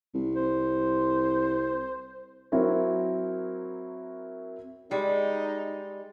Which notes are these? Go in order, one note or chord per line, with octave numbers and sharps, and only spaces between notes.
C2
C5
F#3 C4 E4 A#4 C#5
G3 G#3 D#4